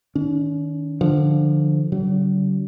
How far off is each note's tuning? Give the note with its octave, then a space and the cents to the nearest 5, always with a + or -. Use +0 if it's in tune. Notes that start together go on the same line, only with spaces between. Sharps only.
D#3 +0 C#4 +45
D3 +20 F3 +0
D3 -45 F#3 +40